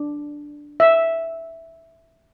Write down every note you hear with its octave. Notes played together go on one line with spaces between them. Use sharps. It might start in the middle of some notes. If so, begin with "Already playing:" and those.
Already playing: D4
E5